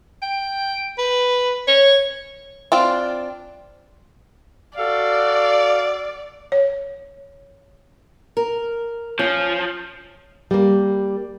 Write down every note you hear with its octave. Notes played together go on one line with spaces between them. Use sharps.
G5
B4
C#5
C4 D4 F4
F#4 A4 D5 F5
C#5
A#4
F3 C#4
G3 A#3